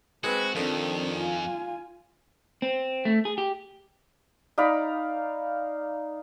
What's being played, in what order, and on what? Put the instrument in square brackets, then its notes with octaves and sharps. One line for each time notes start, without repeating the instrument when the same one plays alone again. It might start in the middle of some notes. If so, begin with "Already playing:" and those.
[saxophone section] G#3 C4 [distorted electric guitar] F#4 [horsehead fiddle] B4
[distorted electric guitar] F2 [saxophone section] D#3 F3 D4 [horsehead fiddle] C4 A4
[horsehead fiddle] F4 G#5
[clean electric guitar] C4
A3
G#4
G4
[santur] D#4 D5 F5 B5